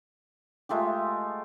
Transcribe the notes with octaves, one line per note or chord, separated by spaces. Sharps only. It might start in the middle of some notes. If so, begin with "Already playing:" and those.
G#3 A3 F4 G4